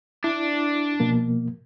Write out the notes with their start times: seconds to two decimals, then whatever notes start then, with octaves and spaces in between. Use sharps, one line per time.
0.24 D4 E4
1.00 B2 F3 A#3